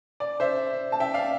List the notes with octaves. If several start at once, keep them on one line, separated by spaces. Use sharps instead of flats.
D5
C5 E5
A5
E5 G5
D5 F5